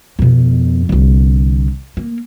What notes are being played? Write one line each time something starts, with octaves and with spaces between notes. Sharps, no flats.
F2 B2
C2 D3
A#3